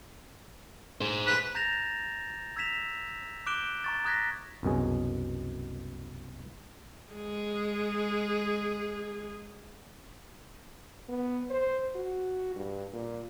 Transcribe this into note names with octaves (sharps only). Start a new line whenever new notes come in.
G#4 C5
B4
A#5 G6 A6 A#6 E7 F7
E6 G#6 A#6 B6 E7 F7
D6 F#6 G6 D7 E7 G7
A#5 C#6 A6
A#5 D#6 F#6 G#6 A#6 B6
C2 F#2 B2 G#4
G#3 G#4
B3
C5
F#4
G2
A#2